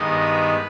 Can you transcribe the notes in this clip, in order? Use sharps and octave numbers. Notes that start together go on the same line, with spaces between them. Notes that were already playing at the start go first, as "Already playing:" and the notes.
Already playing: G2 D#3 G#3 B3 D#4
B4